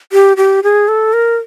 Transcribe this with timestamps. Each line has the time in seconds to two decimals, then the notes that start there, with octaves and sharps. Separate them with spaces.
0.12 G4
0.37 G4
0.63 G#4
0.88 A4
1.13 A#4